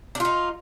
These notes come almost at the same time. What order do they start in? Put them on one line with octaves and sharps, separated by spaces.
D4 F4 D#4